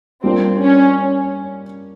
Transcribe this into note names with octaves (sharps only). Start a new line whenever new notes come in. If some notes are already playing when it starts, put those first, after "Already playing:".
G3 A#3 C4 D4 F4
C#4